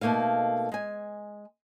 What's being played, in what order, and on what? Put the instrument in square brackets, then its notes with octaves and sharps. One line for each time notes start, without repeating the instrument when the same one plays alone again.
[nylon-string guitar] B2 A3 A#3 D#4 F5
G#3 G#5